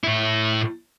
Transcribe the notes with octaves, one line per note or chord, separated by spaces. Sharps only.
A2 E4